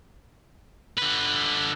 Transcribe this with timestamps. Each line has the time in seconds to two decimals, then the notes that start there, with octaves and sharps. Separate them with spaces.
0.98 D3 B4